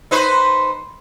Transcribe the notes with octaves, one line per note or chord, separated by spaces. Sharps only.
D#4 B4 C5